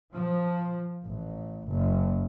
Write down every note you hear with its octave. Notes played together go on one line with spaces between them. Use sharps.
F3
A1
F#1